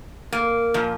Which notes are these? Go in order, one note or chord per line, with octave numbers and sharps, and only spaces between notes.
A#3
A#2 F3